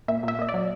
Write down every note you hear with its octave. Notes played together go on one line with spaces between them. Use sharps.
A#2 E5
A#2 E5
A#3 D#5
D5
F#3